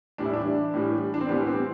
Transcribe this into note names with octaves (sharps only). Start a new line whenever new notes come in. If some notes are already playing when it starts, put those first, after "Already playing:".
A2 E3 G3 D4
E4
D4
A2 E3 G3
D4
C4
A2 E3 G3 B3
C4